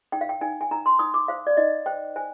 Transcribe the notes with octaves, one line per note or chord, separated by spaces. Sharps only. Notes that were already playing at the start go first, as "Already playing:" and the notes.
D#4 G5
F5
G5
D#4 G#5
G#5
D#4 A#5
C6
D#4 D#6
D6
C5 F5
D5
D#4 D#5
C5 G5
C5 G#5